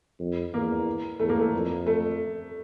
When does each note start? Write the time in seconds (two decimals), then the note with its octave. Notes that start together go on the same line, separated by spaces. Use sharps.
0.20 F2
0.54 E2 A#3
1.20 E2 A3
1.29 A#3
1.40 A3
1.53 F2
1.87 A3